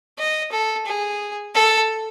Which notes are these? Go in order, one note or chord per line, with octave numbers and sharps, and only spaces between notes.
D#5
A4
G#4
A4